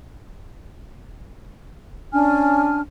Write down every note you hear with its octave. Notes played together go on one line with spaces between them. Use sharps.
C#4 D4 G#5 F6